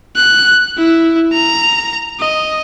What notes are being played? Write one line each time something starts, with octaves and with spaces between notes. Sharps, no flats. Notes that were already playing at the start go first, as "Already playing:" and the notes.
F#6
E4
A#5
D#5